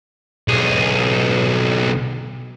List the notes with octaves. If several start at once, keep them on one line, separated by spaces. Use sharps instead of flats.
B1 G#4